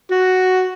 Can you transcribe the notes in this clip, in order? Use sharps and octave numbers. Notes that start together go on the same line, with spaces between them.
F#4